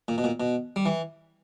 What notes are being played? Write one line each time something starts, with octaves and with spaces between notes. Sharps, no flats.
A#2
B2
A#2
B2
G3
E3